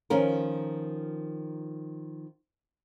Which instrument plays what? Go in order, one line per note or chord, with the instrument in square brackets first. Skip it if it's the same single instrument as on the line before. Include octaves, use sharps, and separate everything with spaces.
[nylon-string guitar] D#3 F3 C#4 F4 A#4